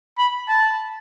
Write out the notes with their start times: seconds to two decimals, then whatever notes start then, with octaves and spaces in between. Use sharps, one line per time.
0.18 B5
0.48 A5